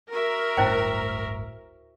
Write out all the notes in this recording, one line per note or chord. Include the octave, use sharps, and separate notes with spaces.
F#4 A#4 E5
D1 G1 A2 E4 C5 G5